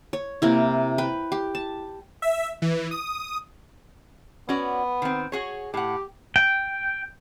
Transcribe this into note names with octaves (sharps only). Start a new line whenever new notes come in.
C#5
C3 A#3 E4
B4 G5
G4
A5
E5
E3
D#6
B3 C#4 F#4 D5
D#3 C4
F#4 G#4 C#5
A2 G4 F#5
G5